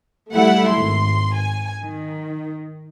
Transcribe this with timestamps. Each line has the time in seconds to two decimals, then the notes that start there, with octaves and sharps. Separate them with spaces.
0.32 G3 A3 E4 F#5
0.69 G#1 C6
1.34 G#5
1.83 D#3